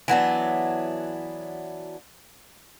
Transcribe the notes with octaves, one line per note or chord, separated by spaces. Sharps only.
E3 F#3 B3 D4